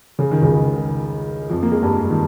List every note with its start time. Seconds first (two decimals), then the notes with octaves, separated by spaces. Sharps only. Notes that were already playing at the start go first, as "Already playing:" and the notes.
0.19 C#3
0.31 D#3
0.42 C#2 C#3
1.50 F2 F3
1.63 A#3
1.72 G#3
1.83 G2 G3
2.10 D#3